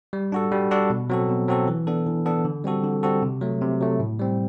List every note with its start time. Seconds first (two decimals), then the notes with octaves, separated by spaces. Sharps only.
0.13 G3
0.32 D4 F#4 A4
0.52 G3
0.71 D4 F#4 A4
0.90 B2
1.10 F#3 C4 F#4 A4
1.29 B2
1.48 F#3 C4 F#4 A4
1.68 E3
1.87 B3 D4 A4
2.06 E3
2.25 B3 D4 A4
2.45 D3
2.64 G3 C4 F#4 A4
2.84 D3
3.03 G3 C4 F#4 A4
3.22 C3
3.41 F#3 A3
3.61 C3
3.81 F#3 A3
4.00 A2
4.19 G3 C4